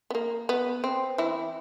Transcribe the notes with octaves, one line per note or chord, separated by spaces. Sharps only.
B3
A#3
B3
C4
E3 E4